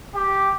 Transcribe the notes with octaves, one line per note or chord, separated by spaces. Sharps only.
G4